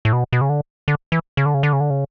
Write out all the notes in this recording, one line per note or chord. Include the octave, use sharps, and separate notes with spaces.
A2
B2
B2
C#3
D3
D3
E3
C#3
D3
C#3
D3
C#3
D3
C#3